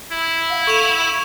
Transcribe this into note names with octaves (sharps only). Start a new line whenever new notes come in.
E4
F5 F#5
A4 C#6 E7 F7